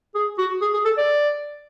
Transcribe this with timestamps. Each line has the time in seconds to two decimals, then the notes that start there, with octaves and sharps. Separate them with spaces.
0.15 G#4
0.38 F#4
0.61 G#4
0.74 G#4
0.85 A4
0.97 D5